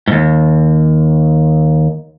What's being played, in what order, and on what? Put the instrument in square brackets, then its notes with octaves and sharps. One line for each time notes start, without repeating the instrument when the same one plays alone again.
[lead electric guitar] D#2 G#2